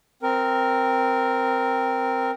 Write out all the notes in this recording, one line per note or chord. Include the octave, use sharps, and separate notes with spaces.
C4 A#4